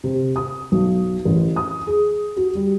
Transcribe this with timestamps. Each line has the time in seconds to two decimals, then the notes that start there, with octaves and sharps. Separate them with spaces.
0.04 C3
0.36 D#6
0.72 B1
1.25 A1
1.56 D#6
1.87 G#4
2.37 F#4
2.55 G3